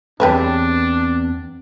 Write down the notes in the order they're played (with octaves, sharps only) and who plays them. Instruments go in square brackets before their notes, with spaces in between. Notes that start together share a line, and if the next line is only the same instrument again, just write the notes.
[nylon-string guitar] E2 C4 A5 [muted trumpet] D4 [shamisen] G4 B4 C#5